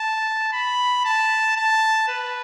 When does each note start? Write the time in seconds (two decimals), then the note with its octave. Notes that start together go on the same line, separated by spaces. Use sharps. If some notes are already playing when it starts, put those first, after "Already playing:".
Already playing: A5
0.53 B5
1.05 A5
1.57 A5
2.08 B4